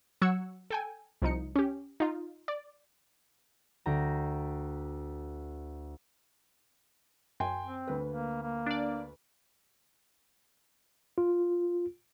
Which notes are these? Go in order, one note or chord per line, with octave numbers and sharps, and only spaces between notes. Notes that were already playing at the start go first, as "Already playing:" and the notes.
F#3 F#5 C#6 E6 G#6 C#7
A4 G5 G#5
C2 F3 D#4 C#7
C#4 G4
D#4 F4
D5
D2 G5 A#5
F#2 G5 G#5 C6
C4
D2 B4
A#3
A#3
D4 D5
F4